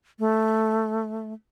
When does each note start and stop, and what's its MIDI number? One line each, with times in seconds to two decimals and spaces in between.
0.19 1.33 57